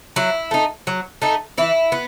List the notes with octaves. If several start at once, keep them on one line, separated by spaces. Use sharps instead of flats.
F#3 E4
A3 D#4
F#3
A3 D#4
E3 E4
B3